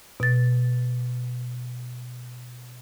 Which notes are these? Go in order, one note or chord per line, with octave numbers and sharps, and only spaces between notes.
B2 A6